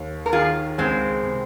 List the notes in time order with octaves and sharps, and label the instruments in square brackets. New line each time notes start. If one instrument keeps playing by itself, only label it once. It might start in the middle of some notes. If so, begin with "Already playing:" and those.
Already playing: [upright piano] D#2
[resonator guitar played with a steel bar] A#4
[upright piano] D#3 [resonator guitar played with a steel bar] F4 G#4
[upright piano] C#2 [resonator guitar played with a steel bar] G#3 C4
[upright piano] C3